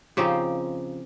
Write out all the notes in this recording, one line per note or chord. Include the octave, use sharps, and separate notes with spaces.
C#3 F3 C4 D#4 G4